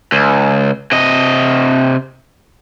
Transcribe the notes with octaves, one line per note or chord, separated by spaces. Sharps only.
C#2
C3 D#5